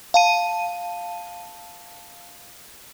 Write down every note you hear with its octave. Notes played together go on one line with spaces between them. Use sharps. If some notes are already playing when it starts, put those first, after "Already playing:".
F5 A5 D#7